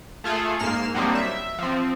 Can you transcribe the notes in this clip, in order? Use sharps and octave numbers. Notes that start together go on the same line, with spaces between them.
A3 F4 G#4 A4
G#2 A#3 F6 C7 E7
F#3 G3 A#3 C4 D4 D#4
E5
F3 C4